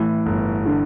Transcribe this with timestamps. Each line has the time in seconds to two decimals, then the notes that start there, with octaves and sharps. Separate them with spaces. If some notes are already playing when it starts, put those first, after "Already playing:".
Already playing: A2 E3
0.26 G1
0.66 D3